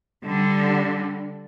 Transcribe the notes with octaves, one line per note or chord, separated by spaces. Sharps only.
D3 G3